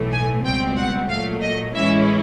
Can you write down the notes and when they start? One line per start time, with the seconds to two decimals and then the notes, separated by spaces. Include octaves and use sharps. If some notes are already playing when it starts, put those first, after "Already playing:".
Already playing: B1 A2 E3 A3
0.12 G#5
0.45 C#2 B2 G3 C4 G5
0.77 F#5
1.09 A#2 F#3 A3 F5
1.42 D#5
1.75 A2 E3 G#3 C#4 E4 E5